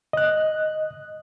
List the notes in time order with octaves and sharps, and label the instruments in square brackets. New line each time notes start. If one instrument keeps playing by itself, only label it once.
[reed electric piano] D#5 F#6